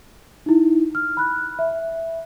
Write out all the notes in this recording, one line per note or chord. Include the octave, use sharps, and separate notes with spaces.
D#4 E4
F6
B5 F#6
E5